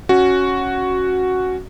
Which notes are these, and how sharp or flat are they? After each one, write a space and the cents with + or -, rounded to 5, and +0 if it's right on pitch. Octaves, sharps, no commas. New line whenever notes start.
C#4 +0 F#4 +0